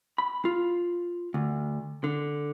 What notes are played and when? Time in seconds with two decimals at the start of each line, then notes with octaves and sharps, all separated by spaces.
0.18 B5
0.45 F4
1.34 D2
2.04 D3